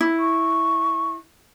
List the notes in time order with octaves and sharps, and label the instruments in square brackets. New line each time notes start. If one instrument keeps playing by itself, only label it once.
[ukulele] E4
[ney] C#6